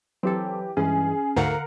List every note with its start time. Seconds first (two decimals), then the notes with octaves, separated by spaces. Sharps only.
0.23 E3 F#3 C4 G4 A4
0.77 G2 E3 G#3 C#4 G#4
1.36 D2 G#2 D3 A#4 F5 F#5